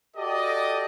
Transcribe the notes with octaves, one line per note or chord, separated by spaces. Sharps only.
F#4 G4 A4 D5 D#5